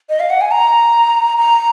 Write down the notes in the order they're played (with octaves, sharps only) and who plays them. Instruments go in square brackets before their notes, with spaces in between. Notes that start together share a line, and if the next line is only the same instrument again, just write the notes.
[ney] D#5
F5
F#5
G#5
A#5
A#5